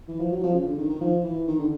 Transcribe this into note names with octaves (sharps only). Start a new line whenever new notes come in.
E3
F3
F#3
F3
C#3
D3
D#3
D#3
F3
E3
D#3
D3